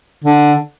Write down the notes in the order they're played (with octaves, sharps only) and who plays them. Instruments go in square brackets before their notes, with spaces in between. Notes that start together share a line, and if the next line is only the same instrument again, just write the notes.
[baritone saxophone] D3